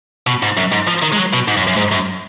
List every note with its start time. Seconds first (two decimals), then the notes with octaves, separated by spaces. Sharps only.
0.27 B2
0.43 G#2
0.57 F#2
0.72 G#2
0.87 F3
1.02 D#3
1.12 G#3
1.17 F#3
1.33 B2
1.48 G#2
1.57 F#2
1.68 F#2
1.77 G#2
1.92 F#2